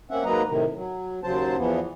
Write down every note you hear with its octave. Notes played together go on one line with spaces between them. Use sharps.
A#3 C4 C#4 E5 F#5
G#2 F#3 A#3 B4 D#5 A#5
A2 C3 D#3
F#3
D#2 C#3 F#3 C5 A5
E2 E3 F3 B3